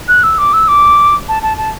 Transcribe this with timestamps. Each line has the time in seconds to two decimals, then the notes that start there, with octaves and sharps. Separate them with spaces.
0.08 F#6
0.23 E6
0.38 D6
0.53 E6
0.68 D6
1.29 A5
1.43 A5
1.58 A5